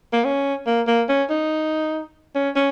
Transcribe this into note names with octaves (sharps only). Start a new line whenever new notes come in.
A#3
C#4
A#3
A#3
C#4
D#4
C#4
C#4